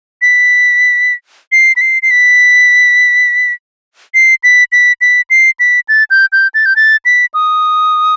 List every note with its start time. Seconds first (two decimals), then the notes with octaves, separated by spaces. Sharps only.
0.22 B6
1.52 C7
1.76 B6
1.81 C7
2.03 C7
2.11 B6
4.14 C7
4.44 B6
4.72 B6
5.01 B6
5.30 C7
5.60 B6
5.89 A6
6.10 G6
6.32 G6
6.54 A6
6.66 G6
6.76 A6
7.05 B6
7.34 D#6